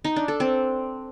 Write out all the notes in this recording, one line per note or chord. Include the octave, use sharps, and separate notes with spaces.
D#4
D4
A4
C4